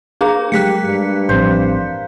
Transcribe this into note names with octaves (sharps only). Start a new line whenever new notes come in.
A#3 D4 G#4 A#5
F#3 G#3 A3 G4 F#6 B6 C#7
G2
A1 F3 C4 C5